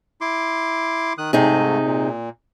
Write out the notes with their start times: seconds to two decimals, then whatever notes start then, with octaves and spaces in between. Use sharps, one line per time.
0.21 E4 C6 D6
1.18 D#3 D#6 F#6
1.33 G#2 C3 A3 D#4 G#4
1.85 A#2